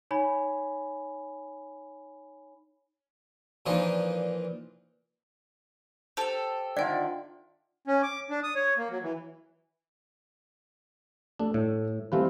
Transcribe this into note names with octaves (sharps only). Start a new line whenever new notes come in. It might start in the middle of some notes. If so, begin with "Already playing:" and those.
D#4 C#5 G#5 B5
A#2 E3 F3 D4 D#4
G4 A4 C5 F7
D3 D#3 F4 D5 E5 G5
C#4
D6
D4
D#6
C#5
A#3
F#3
E3
A3 D4
A2
E3 G3 A3 C4 F4 B4